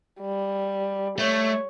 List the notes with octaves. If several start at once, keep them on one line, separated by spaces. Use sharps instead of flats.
G3
A3 C#5